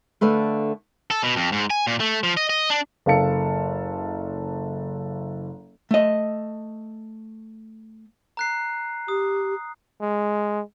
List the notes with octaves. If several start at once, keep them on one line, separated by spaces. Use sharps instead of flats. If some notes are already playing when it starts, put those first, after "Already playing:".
D3 A3 B4 F5
A4
B2
F2
G#2
G#5
A#2
A3
F3
D#5
D#5
D4
F#1 A4 F5 A5 C#7
A3 D#5
A#5 F#6 C7
G4 D#6
G#3